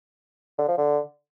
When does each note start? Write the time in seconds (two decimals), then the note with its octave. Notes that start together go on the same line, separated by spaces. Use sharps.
0.58 D3
0.68 F3
0.78 D3